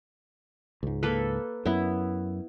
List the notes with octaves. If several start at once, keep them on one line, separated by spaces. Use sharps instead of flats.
C#2 G#2
A#3 A4 B4
F#2 B3 E4